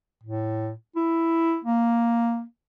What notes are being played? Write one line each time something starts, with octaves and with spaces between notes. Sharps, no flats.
A2
E4
A#3